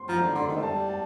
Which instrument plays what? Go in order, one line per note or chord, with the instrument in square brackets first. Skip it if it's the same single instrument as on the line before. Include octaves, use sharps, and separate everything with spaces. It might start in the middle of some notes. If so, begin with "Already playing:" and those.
Already playing: [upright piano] C6
[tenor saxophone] F3 [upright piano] A#5
[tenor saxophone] D3
[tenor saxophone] D3 [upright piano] C6
[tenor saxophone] D#3
A3
[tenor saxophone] G3 [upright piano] A5
[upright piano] A5